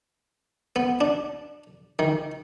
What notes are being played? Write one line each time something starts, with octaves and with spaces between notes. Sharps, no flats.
B3
D4
D#3